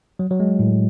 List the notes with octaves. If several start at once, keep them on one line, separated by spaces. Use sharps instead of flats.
F#3
F#3
G#3
A2